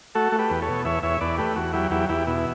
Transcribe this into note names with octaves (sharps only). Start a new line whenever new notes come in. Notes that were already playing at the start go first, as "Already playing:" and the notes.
A3 F#4 A4
A3
G4 B4
E2
A4 C#5
B2
E2 C#5 E5
E2 C#5 E5
E2 B4 D5
A3 G4 B4
E2 F#4
F#3 E4 G4
E2 E4 G4
E2 E4 G4
B2 E4